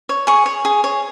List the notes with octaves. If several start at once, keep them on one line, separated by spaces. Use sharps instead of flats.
C#5
G#4 C#6
C#5
G#4
C#5